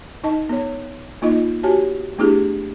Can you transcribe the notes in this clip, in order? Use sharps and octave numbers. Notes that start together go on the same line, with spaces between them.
D#4 D#5 A5
B3 C#5
A#3 D#4 F4 D#5
F#4 G4 C#5 G#5 A5
A3 B3 D4 E4 G4 G#4